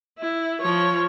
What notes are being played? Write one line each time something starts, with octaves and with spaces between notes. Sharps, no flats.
E4
F3 C#5